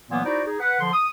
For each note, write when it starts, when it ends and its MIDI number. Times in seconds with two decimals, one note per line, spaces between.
0.10 0.21 46
0.10 0.21 52
0.10 0.21 54
0.10 0.21 58
0.10 0.21 59
0.24 0.42 63
0.24 0.42 64
0.24 0.42 66
0.24 0.42 72
0.24 0.42 74
0.46 0.58 63
0.46 0.58 68
0.59 0.78 71
0.59 0.78 78
0.80 0.91 50
0.80 0.91 53
0.80 0.91 84
0.92 1.07 87